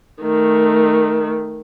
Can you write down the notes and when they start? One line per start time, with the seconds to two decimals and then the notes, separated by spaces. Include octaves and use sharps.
0.22 D#3 A3